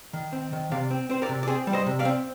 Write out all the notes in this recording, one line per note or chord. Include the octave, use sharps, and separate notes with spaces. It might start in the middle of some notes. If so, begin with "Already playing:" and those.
D#3
C4
D#3
C3 D5 F5
C4
C4 C5
A#4 D5
C3
D5
C4 G#4 C5
G3
C5 D#5
C3
D5 F5
C4